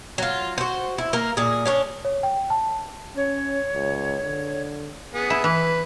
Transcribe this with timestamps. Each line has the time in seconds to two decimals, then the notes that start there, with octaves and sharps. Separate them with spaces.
0.18 F#3 F4
0.58 F#4 C5
0.98 E4
1.13 A#3 A#4
1.37 A#2 G#4
1.66 C#4 D4 C#5
2.05 C#5
2.23 G5
2.50 A5
3.17 C#4 C#5
3.74 C#2
4.22 D3
5.14 B3 G#4
5.30 E4
5.44 E3 B4